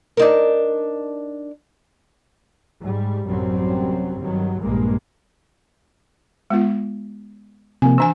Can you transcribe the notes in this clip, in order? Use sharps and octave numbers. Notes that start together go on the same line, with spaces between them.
D4 D#4 A#4
G#2 G3
A1 F#2 C3 F#3 G3 C4
G2 D#3 F#3
A#1 G2 A#2 G#3 A#3
G#3 B3 F4
C3 F3 A#3 G#5
E3 D4 G#5 E6